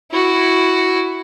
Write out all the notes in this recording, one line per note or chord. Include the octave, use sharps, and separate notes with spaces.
E4 F#4